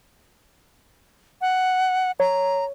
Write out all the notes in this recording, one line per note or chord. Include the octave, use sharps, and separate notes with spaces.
F#5
C#5 A#5